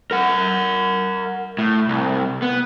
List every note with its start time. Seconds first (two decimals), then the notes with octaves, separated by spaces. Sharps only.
0.11 A#4 F#5
1.58 A2
1.89 C2
2.42 B3